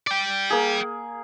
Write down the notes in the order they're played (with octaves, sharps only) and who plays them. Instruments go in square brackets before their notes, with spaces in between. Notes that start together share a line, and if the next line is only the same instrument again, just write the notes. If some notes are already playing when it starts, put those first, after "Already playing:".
[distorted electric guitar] D5 G5
[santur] A#3 G#4